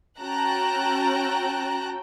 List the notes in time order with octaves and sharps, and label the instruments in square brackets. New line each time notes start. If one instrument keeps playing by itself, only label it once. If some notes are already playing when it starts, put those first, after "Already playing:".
[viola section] C#4 F#4 G5 [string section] A5 A#5 F#6